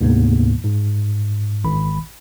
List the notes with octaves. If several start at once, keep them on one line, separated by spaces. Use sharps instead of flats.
D2 G#2 C3 A#3 B3
G#2
G#1 B5